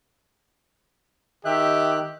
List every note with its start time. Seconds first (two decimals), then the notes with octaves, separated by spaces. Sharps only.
1.45 D#3 G4 D#5 E5 F#6